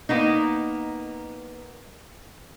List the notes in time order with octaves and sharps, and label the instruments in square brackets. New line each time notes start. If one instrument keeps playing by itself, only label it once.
[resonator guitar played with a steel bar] A#3 B3 D#4